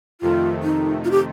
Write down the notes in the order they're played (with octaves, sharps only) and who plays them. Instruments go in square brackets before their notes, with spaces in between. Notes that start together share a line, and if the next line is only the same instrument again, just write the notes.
[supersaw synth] F2 C3 D#3 A3 [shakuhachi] F4
[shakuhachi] D#4
F4
G4